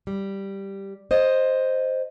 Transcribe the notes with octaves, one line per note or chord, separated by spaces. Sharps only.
G3
C5 D#5